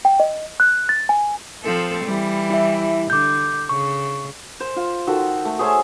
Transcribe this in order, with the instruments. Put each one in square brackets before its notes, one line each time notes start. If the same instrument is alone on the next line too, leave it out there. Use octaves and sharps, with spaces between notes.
[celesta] G5
D#5
F#6
A6
G#5
[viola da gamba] F3 C4 A4
E3 G3
[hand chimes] E4 E5
[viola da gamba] D3 [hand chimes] D6 G6
[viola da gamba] C#3 [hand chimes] C#6
[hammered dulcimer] C5
F4
D#3 F#4 A4
A3
G#4 C5 C#5 E5